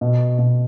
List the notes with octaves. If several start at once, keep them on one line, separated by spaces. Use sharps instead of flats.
B2
B2